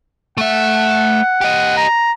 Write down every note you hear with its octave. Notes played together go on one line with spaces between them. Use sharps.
A3 E5 F#5
G4 D#5
A#5